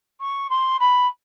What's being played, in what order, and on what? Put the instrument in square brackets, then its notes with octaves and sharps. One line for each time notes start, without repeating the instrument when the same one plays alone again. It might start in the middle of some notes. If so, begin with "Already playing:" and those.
[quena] C#6
C6
B5